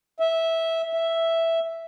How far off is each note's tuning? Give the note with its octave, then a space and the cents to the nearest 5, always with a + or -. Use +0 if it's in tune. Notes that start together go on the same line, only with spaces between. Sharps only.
E5 -10
E5 +0